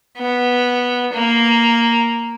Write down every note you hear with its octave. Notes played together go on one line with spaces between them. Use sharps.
B3
A#3